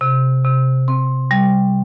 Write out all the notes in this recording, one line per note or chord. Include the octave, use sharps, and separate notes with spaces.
C3
C3
C4
G3